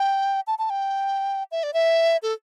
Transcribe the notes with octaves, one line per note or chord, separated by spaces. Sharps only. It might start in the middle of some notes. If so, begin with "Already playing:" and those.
Already playing: G5
A5
A5
G5
E5
D5
E5
A4